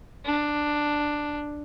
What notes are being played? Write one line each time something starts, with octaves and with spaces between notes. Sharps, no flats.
D4